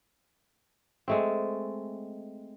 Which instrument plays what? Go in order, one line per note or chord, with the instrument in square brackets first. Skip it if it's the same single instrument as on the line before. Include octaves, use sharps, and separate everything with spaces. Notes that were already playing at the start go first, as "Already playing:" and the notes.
[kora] G#3 A3 C4